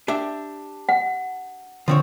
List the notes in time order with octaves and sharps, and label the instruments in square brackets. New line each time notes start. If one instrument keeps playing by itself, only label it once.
[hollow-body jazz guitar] D4 G4 E5
[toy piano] F#5
[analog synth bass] D3 [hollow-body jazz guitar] F3 C4 C#5